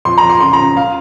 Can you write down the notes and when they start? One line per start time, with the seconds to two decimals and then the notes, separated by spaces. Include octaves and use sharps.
0.05 F2 C6
0.18 A#5
0.23 F2
0.29 C6
0.40 C#3 C6
0.53 A#5
0.59 C#3
0.77 F5